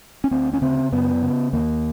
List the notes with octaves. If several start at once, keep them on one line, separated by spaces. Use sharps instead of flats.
C#4
D2 C4
C#4
C#3 C4
F#2 B3
C#3
D#2 A#3